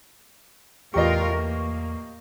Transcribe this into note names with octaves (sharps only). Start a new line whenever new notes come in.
E2 A2 F4 G4 A#4 D5 D#5 C#6
A#3